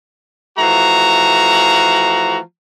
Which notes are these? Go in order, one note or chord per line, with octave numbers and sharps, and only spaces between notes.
E3 F3 A3 F#4 A#5